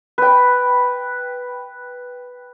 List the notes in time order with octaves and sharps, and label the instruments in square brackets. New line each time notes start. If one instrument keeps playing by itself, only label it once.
[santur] B4 G5